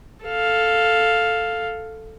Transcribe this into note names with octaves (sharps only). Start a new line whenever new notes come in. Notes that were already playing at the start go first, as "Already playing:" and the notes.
A4 F5